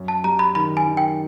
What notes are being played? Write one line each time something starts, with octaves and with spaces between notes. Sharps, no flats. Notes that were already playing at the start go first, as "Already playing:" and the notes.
Already playing: F#2
A5
G3 A#5
B5
D#3 B5
G#5
D#3
G5